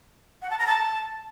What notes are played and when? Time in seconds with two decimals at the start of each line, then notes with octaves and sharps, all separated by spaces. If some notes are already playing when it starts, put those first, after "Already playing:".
0.42 F#5
0.50 A5
0.58 A#5
0.67 A5